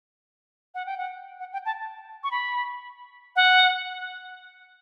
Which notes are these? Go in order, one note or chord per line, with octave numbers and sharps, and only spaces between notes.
F#5
G5
F#5
F#5
G5
A5
C#6
B5
F#5